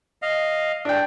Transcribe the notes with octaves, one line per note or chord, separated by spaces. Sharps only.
D#5 F5
D4 G5